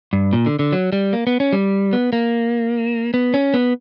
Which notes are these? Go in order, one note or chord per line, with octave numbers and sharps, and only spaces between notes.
G2
A#2
D3
D3
F#3
G3
A#3
B3
C#4
G3
B3
A#3
B3
C#4
B3